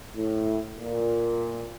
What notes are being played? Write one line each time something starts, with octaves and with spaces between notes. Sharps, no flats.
A2
A#2